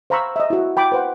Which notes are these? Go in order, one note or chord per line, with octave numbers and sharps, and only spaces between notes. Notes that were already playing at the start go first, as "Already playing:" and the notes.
C5 F5 A#5 B5 C#6 E6
D#5 E5
E4 F#4
G5 B5 D6
B4 C5 F#5